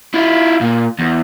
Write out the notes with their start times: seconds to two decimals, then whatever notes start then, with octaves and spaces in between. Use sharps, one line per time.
0.14 E4 F4
0.61 A#2
0.99 E2